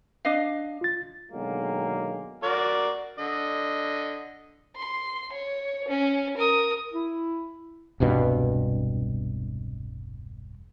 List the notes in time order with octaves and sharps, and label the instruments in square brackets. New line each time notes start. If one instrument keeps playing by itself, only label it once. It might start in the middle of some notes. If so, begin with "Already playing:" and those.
[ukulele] D4 D#5 F5
[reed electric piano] F4 A6
[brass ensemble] B2 D3 D#3 F#3 G#3 A#3
[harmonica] F#4 A#4 D5
D3 D#5
[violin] C6
C#5
C#4
A#4 D#6
[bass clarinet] E4
[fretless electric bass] E1 C2 G2 B2